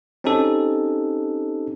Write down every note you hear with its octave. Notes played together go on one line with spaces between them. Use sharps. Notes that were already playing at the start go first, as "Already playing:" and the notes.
C4 C#4 D#4 G4 A4